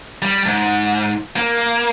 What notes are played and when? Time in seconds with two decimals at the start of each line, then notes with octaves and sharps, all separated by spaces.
0.22 G3
0.46 G#2
1.37 A#3